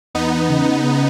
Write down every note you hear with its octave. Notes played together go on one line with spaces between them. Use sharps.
E2 B3 D#4
C#3
C#3